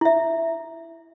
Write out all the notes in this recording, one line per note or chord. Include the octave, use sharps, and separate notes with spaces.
E4 E5